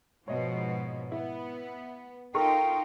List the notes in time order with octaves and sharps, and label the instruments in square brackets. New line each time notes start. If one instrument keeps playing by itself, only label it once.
[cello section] G#2 B2 F3 [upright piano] C#5 D#5
[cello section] B3 [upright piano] E4
[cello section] D#4 F4 [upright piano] A4 A#4 C#6 [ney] G5